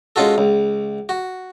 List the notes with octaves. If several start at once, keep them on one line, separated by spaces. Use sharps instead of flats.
G#3 C#4 F4 F#4 A4
C#2
F#4